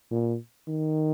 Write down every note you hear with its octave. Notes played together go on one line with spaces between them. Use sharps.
A#2
D#3